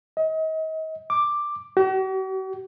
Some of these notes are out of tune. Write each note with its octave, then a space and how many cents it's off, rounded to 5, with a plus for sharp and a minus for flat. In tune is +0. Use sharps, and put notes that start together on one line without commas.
D#5 +35
D6 +5
F#4 +45